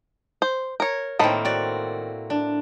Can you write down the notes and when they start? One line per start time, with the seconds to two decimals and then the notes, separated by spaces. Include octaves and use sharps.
0.42 C5
0.80 A#4 C#5
1.19 A2 D#3 A#3 C4 A5 B5
1.45 F#4 D5
2.30 D4